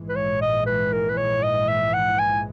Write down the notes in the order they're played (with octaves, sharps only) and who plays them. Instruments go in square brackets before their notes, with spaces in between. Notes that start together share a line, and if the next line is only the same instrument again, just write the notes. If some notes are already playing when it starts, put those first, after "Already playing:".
Already playing: [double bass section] A#1 G#2 E3 G#3
[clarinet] B4
C#5
D#5
B4
A#4
B4
C#5
D#5
E5
F#5
G#5